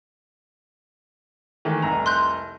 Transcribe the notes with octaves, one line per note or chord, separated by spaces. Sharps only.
D#3 E3 A3
F1 C2 A#5
C6 F#6 G6